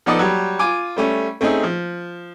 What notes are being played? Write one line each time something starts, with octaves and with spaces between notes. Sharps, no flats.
F3 B3 D#4 A4 D5 D#5
F#3 G3 G4
F4 G#5 D6
G3 A3 C#4
A3 C4 C#4 D#4 G#4
F3